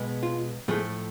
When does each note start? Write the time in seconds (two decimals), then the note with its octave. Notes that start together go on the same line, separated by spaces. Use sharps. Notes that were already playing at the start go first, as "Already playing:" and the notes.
Already playing: B2 G#3 B3
0.23 F4
0.68 A2 F3 A3 G#4